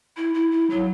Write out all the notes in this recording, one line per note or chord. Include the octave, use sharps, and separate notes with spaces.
E4
E4
E4
F#3